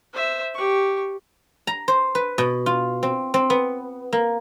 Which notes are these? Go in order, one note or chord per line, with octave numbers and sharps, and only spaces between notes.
C5 E5
G4 C#6
A#5
C5
B4
B2
F4
C4
C4
B3
A#3